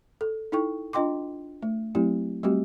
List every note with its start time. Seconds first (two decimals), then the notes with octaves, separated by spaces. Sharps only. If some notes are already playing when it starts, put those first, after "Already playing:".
0.21 A4
0.52 D#4 E4 A4 G5 C#6
0.93 D4 F4 D#5 G5 C6 D6
1.62 A3
1.95 F#3 A3 C4 E4 G4
2.43 G3 A3 C4 F#4 G4